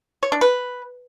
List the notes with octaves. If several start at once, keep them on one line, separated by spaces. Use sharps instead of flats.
C#5
D4
B4